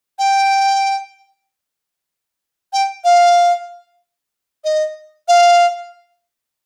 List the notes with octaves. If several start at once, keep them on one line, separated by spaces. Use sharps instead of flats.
G5
G5
F5
D#5
F5